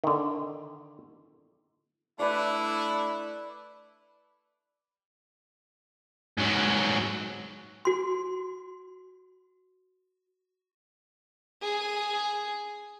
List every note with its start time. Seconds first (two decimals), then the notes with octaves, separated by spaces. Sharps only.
0.04 D3 D#3
2.20 A3 D4 E4 B4 D5
6.38 G#2 F#3
7.85 F#4 C6
11.62 G#4